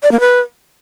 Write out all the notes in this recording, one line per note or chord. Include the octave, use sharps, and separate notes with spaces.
D5
A#3
B4